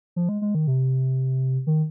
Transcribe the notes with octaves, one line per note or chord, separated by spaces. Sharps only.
F3
G#3
G#3
D#3
C3
D#3